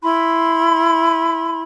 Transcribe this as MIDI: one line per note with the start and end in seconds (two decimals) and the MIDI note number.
0.02 1.62 64
0.02 1.62 83
0.02 1.62 84